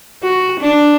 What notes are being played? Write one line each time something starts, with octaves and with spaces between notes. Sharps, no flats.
F#4
D4